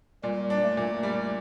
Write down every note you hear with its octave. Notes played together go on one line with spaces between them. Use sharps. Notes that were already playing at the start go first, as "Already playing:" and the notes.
A#2 G3
D4
A3
A#2
G3